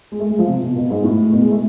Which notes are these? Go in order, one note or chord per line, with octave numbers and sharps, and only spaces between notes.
G#3
A3
G#3
F3
C3
B2
B2
G#2
A2
B2
G#3
A3